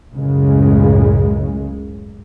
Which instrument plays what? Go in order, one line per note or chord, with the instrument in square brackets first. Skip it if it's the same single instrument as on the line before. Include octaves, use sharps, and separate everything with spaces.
[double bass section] C#2 F#2 A2 C#3 G#3